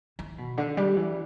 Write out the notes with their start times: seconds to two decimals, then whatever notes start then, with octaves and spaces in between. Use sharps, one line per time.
0.19 E3
0.38 B2
0.58 D3
0.77 G3
0.97 E3